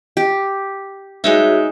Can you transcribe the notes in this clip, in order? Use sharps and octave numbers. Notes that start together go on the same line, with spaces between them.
G4
G#3 D#4 F#4 G#4 C#5 E5